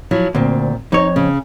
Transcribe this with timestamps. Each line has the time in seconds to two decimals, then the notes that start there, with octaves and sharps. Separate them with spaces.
0.11 F3 F#3 E4
0.35 D2 A#2 C4
0.92 F2 D#4 C#5
1.16 C#3